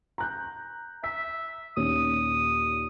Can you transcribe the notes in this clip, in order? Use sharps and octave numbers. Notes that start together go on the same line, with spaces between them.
A#5 F#6 G6
E5 B6
D#2 A#2 C#4 D#6